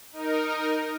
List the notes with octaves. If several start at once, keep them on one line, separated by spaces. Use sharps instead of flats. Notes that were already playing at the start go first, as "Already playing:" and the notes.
D#4 A#4